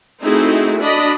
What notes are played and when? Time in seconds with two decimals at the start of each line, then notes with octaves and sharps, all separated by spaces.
0.23 A3 C4 D#4 E4 F#4 G#4
0.79 D4 F#4 D5 D#5 B5